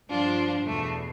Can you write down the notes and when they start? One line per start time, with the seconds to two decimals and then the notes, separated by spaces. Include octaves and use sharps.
0.09 G2 F3 D4 F4
0.67 E2 B2 A3